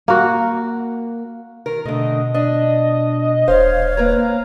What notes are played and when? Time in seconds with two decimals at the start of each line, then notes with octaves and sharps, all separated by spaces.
0.08 A#3 F#4
1.66 D#3 A#4
1.85 B2 D3 A3 D#5
2.34 D4 D#5
3.48 D#1 C5 C#5 F5
3.97 A#3 B4 A#5